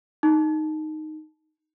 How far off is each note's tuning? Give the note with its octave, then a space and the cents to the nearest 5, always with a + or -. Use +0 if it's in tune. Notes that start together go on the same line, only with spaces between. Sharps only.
D#4 -5